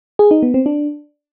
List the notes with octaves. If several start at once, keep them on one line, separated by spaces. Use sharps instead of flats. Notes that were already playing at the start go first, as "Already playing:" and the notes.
G#4
D#4
B3
C4
D4